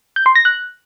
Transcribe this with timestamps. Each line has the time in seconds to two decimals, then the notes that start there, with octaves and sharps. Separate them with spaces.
0.16 G6
0.26 C6
0.36 A#6
0.45 F#6